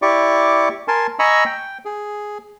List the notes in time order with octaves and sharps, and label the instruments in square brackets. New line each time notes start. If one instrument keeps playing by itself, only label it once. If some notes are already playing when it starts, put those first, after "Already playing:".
[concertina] E4 G4 D5 C#6 D6
A#4 G#5 A5 C6
D#5 G#5 A#5 B5 C#6 E6
G5
G#4